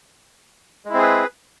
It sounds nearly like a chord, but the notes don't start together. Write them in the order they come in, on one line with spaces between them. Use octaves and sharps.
G#3 E4 C4 G#4 B4